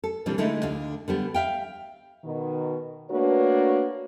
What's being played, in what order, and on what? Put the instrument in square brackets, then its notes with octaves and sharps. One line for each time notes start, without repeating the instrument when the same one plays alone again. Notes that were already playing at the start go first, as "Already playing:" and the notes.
[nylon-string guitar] A4
A#2 E3 G3 C4 D4
D3 G#3 A3 D#4 E4
D2 D3 F5
D3 G3 B3
E5 F5 G5
[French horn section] B2 D#3
A3 A#3 D4 F#4 B4 C#5